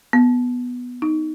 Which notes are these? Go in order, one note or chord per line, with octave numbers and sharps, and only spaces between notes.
B3
D#4